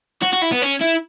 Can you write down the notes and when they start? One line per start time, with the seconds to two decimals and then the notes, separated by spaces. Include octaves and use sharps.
0.23 F#4
0.33 F#4
0.42 E4
0.52 B3
0.62 C#4
0.81 E4